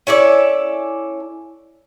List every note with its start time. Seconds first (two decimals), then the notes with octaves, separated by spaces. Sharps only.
0.07 C#4 E4 A4 D5